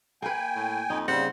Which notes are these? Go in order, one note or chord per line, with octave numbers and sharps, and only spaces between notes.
A#3 B4 G5 G#5
A2
F2 D#4
C#3 G3 C4 F#5